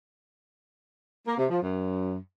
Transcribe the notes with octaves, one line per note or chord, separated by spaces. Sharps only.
A#3
C3
F3
F#2